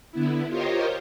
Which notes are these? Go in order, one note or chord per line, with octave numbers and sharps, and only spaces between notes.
D3 B3 E4
F4 G4 A#4 C5 C#5 D#5